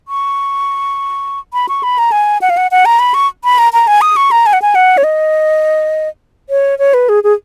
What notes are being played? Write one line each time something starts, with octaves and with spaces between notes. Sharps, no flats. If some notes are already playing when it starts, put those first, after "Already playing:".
C#6
B5
C#6
B5
A#5
G#5
F#5
F5
F#5
F#5
A#5
B5
C#6
B5
A#5
A#5
G#5
D#6
C#6
A#5
G#5
F#5
G#5
F#5
C#5
D#5
C#5
C#5
B4
G#4
G#4